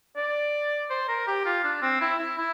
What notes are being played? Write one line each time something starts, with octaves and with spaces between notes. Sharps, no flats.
D5
C5
A#4
G4
F4
D4
C4
E4
E4
E4